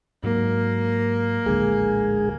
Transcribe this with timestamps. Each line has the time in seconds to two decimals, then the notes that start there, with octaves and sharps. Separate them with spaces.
0.24 G#2 F#3 A#3
1.46 D1 A#1 D3 G#3 G#4